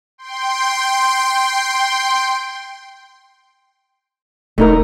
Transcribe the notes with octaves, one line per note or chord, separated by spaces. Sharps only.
G5 C6
E1 A3 D#4 A#4